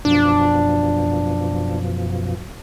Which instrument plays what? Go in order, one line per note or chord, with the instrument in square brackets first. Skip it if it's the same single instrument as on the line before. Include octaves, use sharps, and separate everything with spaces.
[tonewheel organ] F#2 B2 F3 [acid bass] D4